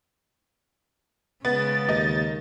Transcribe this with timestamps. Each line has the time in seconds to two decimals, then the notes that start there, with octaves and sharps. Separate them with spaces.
1.45 C#3 G#3 B3 A6
1.89 D#2 D#4